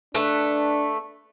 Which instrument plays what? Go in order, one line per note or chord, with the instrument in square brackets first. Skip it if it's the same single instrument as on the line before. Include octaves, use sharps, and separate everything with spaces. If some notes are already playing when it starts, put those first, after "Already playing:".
[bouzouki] A3 B4 [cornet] D4